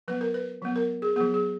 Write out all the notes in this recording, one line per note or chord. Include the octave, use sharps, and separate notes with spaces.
F#3 B3 B4
A#4
B4
F#3 B3
A#4
G#4
F#3 B3 G#4
G#4